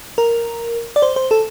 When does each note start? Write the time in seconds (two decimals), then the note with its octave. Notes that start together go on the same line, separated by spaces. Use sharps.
0.18 A#4
0.96 D5
1.02 C5
1.16 C5
1.31 A4